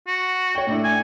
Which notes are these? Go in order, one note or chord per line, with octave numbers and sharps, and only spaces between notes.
F#4
C#5 G5
A2 D4 E4
G#5